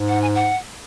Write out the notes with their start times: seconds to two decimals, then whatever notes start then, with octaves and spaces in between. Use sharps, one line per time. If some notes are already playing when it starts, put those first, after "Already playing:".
Already playing: G#2
0.09 F#5
0.22 G#5
0.35 F#5